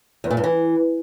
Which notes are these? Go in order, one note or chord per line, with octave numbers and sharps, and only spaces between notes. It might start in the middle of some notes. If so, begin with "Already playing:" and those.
E2
A#2
G2
E3